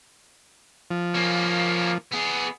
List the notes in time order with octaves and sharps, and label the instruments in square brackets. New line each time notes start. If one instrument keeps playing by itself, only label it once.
[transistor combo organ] F3
[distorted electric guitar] A#3 C#4
B3 G#4